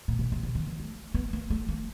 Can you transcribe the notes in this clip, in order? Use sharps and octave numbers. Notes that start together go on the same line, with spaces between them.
A#2
B2
C3
C3
D3
E3
A3
B3
A#3
A3
A#3